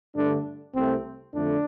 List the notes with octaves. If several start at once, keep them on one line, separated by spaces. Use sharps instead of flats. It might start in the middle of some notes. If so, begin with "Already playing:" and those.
G2 D3 A3 D4
C2 C3 A3 C4
F2 D3 A3 D4